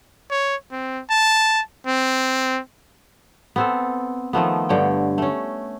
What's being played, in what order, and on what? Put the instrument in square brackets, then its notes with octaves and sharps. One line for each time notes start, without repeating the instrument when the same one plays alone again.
[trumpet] C#5
C4
A5
C4
[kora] B3 C4 A4
D#3 F3 A3 B3
G2 D3 C#5 G5
A3 C#4